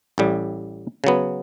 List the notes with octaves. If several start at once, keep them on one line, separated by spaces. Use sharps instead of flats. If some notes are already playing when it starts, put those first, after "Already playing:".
A1 A2 G3
C#3 F#3 B3